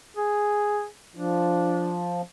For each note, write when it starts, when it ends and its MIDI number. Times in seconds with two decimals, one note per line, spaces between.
0.17 0.86 68
1.15 2.22 53
1.15 2.01 62